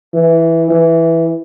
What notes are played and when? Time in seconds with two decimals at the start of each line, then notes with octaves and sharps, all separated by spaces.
0.14 E3
0.70 E3